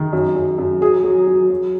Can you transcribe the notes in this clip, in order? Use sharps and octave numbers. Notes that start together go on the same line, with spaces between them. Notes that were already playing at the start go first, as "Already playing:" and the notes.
Already playing: D#3
F#2
F#2
F#2
F#3 G#4
F#3
F#3
F#3